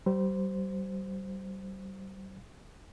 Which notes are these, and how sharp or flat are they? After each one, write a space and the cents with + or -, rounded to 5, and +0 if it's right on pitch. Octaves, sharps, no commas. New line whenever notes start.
G3 -35 C5 -10